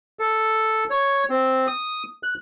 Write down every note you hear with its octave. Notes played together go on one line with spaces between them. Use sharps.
A4
C#5
C4
D#6
F#6